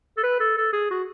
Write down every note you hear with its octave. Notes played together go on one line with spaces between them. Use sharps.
A4
B4
A4
A4
G#4
F#4